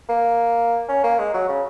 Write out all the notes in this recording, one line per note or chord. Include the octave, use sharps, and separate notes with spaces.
A#3
C#4
A#3
G#3
F#3
C#3